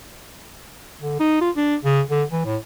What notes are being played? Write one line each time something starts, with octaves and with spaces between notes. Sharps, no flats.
D3
D#4
F4
D4
C#3
D3
E3
A2